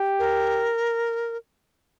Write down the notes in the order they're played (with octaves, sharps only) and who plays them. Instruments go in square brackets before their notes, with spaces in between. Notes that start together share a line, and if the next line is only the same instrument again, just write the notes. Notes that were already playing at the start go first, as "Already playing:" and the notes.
Already playing: [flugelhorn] G4
[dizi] A#4